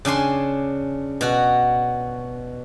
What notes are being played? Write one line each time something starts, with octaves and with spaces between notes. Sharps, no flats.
C#3 D4 G#5 C6
B2 F#4